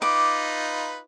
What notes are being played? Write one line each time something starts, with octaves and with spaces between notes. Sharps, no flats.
D#4 F4 B4 D6